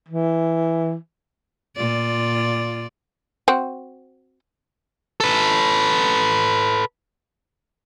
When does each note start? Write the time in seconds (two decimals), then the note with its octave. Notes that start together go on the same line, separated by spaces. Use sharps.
0.09 E3
1.76 A#2 F4 D5
3.48 C4 F#4
5.20 A4 B4